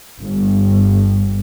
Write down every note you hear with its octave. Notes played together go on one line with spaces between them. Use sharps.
G1